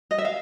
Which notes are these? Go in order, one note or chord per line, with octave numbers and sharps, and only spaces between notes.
D#5
E5
F5